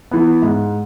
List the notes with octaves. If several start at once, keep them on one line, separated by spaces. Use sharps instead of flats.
E3 B3
G#2